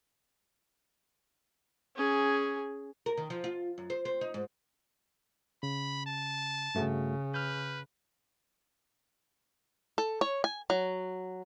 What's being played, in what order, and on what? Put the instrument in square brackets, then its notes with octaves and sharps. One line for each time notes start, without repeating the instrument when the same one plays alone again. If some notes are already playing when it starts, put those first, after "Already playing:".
[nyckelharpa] C#4 G#4
[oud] A#4
D#3
F3
F4
F#2
C5
C4
D#4
G#2
[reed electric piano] C#3 [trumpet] B5
[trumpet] A5
[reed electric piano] G2 A3 F#4 [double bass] C#3
[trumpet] B4 [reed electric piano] F6 G6
[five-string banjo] A4
C#5
G#5
F#3